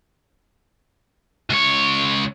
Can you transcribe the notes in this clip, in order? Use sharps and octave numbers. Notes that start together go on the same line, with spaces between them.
C#2 C#5